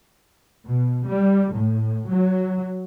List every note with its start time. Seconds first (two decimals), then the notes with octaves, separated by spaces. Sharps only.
0.66 B2
1.06 G3
1.52 A2
2.08 F#3